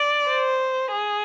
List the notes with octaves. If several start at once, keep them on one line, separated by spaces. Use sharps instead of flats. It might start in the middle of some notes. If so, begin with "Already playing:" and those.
Already playing: D5
C5
G#4